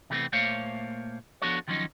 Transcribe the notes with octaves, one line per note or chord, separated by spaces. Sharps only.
C3 E3 G3 A3 B3 C4
A#2 A3 A#3 C5 C#5 F5
F3 B3 D4 F#4 A4 C#5
D#3 F3 F#3 C#4 D#4